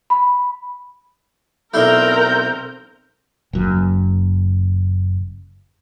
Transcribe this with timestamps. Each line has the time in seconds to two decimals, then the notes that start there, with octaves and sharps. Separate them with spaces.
0.10 B5
1.74 B1 C4 E4 A4 A#4 D5 C6 G6
3.53 F#1 F#2